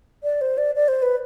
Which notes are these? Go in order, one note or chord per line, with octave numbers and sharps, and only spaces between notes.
D5
C5
D5
D5
C5
B4